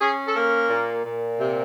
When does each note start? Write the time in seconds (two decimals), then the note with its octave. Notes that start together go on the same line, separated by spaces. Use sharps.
0.01 C#4 G#4
0.27 A4
0.35 A#3 A#4
0.69 A#2
1.05 A#2
1.39 C3